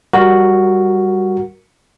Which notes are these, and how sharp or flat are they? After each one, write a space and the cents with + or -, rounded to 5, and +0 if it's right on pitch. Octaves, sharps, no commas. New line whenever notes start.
G3 +0 F#4 +0 A#4 +0